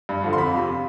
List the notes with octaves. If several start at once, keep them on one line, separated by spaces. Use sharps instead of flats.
G2
D3 F3
C6
F2 B5
C3 F3